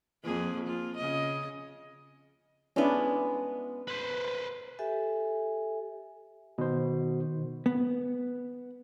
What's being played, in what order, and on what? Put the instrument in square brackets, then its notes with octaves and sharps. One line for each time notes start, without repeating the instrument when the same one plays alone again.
[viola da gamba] F2 A#3 G#4
F4
C#3 D#5
[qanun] G#3 B3 [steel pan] C#4 D4 E4
[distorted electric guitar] B4 C5
[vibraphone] G4 A4 E5 G#5
[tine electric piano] B2 C5 [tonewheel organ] D#3
[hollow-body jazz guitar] B3